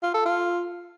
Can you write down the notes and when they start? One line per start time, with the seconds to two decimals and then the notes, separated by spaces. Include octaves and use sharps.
0.03 F4
0.14 A4
0.26 F4